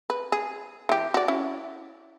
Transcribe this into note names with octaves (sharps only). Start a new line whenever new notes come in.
B4
G#4
E3 G4
F#4 D5
C#4 E4